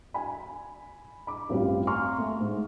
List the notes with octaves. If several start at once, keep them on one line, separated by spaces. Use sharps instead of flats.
G#5 B5
B5 D6
A1 G2 C4 F4 F5
F5 G#5 A#5 C6 C#6 F6
A3
G#2